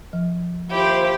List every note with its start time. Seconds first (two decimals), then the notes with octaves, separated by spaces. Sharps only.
0.13 F3
0.71 D#2 E4 F4 G4 C5